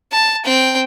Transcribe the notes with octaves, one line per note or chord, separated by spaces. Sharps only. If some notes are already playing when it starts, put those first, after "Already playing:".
A5
C4 G5